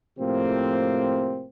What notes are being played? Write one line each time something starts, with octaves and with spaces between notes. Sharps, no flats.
A2 C3 F3 A#3 C4